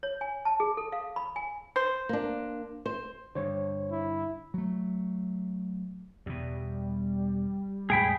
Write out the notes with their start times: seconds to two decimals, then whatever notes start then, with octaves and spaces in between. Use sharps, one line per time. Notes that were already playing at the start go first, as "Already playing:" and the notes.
0.03 C#5
0.21 G#5
0.45 A5
0.60 G#4
0.77 A4
0.92 F5
1.16 B5
1.36 G#5
1.76 C5
2.09 A#3 D4
2.86 C5
3.35 G2 D3 C5 C#5
3.92 E4
4.54 F#3 A3
6.26 E2 B2 G3
7.90 E2 A2 G#3 G#4 G5 B5